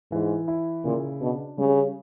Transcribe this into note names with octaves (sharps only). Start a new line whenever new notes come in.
G#2 E3
E4
A#2 C#3
B2 D4
C#3 G3